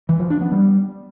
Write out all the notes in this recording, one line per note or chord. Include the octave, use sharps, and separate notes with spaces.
E3
F3
D4
B3
G3